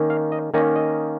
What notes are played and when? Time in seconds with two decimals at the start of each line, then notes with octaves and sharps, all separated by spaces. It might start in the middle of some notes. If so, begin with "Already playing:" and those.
Already playing: D#3 A#3 C#4
0.10 F5
0.32 D#5
0.54 D#3 A#3 C#4 D#5
0.76 D#5